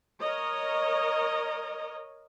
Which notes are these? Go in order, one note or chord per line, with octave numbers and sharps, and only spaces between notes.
A#4 C#5 D#5